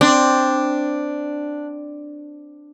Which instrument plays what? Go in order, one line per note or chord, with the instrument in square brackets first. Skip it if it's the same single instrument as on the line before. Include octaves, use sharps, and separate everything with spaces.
[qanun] C4 [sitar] D4